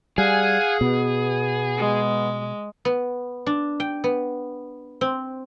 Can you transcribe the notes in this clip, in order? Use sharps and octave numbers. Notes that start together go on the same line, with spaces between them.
G3 G#4 F5 F#5 G#5
B2 B3
G#3
B3
D4
G5
B3
C4